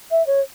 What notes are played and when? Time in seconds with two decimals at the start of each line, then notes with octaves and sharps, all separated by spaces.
0.11 E5
0.26 C#5